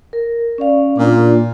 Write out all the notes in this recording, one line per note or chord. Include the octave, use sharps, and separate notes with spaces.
A#4
C#4 D5 F5
A#2 D4